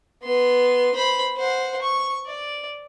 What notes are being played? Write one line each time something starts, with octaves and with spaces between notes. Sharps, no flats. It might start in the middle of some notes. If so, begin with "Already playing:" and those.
B3 C6
C5 B5
C5 F#5
C#6
D5